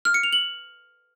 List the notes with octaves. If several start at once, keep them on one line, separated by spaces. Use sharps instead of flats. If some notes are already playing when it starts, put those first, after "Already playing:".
F6
C#7
F7
F#7